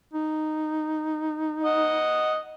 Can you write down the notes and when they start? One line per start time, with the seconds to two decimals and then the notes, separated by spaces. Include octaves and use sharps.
0.13 D#4
1.64 D#5 F#5